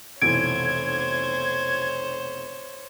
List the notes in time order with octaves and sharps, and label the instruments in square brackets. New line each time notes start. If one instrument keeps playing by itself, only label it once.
[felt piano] F1 B1 E3 [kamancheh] C5 C#5 [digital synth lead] G#6 [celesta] D7